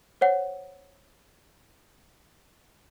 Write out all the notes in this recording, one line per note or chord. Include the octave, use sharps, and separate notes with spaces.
C5 C#5 F#5